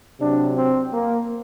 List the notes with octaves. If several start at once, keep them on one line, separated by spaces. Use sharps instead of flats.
C3 F#3 D4
C4
A#3